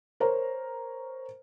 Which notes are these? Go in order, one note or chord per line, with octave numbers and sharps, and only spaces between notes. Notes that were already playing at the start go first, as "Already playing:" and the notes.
A#4 C5 C#5 A#5